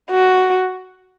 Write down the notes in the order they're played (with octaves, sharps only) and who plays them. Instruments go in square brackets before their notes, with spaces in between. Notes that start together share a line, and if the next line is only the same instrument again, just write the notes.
[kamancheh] F#4